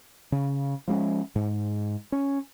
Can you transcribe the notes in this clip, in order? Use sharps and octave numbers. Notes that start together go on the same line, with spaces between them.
C#3
F3 G#3 C#4
G#2
C#4